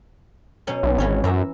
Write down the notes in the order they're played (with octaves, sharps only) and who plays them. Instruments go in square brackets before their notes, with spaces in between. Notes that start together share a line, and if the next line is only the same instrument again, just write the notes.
[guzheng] B2 F#3 C#4
[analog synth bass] B1
[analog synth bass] G#1 [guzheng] E3 C#4 C#5
[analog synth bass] F#2 [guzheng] E5 A#5